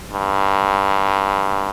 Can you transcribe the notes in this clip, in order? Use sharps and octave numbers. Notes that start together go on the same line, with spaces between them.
G2